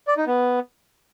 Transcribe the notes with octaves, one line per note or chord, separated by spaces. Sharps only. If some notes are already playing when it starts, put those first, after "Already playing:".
D5
D#4
B3